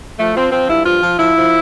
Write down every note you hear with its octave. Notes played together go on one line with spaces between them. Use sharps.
F3 A3
F3 C4
F3 C4
G2 E4
F3 F4
F3
F3 E4
F3